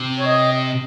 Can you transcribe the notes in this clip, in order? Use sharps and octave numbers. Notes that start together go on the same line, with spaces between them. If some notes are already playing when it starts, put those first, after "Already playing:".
Already playing: C3
C#5
D#5